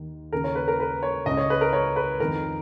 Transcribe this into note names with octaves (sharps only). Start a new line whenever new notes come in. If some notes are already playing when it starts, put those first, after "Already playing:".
Already playing: D#2 D#3
D#2 C#3 A#4
C#5
B4
A#4
B4
C#5
C#2 C#3 D#5
C#5
B4
A#4
C#5
B4
F2 D#3 A#4